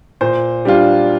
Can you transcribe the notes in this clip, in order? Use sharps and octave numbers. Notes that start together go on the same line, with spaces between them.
A#2 C5
G3 D4 F4